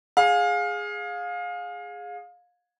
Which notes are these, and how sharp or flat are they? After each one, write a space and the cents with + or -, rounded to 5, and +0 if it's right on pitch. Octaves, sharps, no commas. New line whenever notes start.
G#4 +0 F5 +25